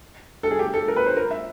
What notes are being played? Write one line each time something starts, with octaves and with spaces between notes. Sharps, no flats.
A4
G#4
G4
A4
A#4
B4
C5
A#4
E5